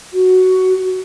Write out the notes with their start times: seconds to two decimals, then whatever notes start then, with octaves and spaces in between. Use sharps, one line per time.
0.13 F#4